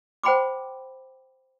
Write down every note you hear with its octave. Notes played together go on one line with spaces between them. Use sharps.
C5 F#5 G5 B5 C6 D6